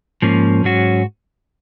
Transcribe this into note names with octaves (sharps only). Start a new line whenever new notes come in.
G#2 F3 A#3 C#4
G#2 F#3 C#4 F#4